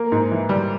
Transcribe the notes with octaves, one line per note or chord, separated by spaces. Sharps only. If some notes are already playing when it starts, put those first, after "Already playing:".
Already playing: A#3
G#2
E3
G3